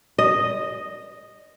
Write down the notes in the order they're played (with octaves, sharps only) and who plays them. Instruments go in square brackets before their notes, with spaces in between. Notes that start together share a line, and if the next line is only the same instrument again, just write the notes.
[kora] D#5